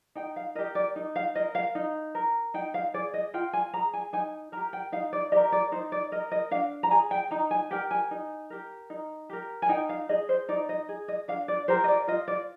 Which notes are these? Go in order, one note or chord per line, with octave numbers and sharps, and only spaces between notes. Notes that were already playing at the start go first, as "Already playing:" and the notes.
D#4 G5
F5
G4 A#4 D#5
D5
D#4
F5
A#4 D#5
F5
D#4
A#4
D#4 G5
F5
G#4 D5
D#5
F4 G5
G#5
G#4 A#5
G#5
D#4 G#5
G4 A#4 A#5
G5
D#4 F5
D5
G4 A#4 D#5
D5
D#4 C5
D5
A#4 D#5
D#5
D4 F5
A#5
G#4 G#5
G5
D#4 A#5
G#5
G4 A#4 G5
G#5
D#4
G4 A#4
D#4
G4 A#4
G#5
D#4 G5
F5
G#4 D#5
C5
D#4 D5
D#5
G#4
D#5
D4 F5
D5
G4 A#4 C5
D#5
D5
F4 D#5
D5